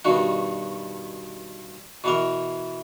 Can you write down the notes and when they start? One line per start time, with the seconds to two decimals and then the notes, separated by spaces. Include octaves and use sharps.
0.05 G2 B2 D#3 F#4
2.04 B2 E3 A#4